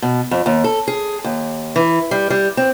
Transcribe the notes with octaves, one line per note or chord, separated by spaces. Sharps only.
B2
F2
D#2
A4
G#4
D#2
E3
G3
G3
C4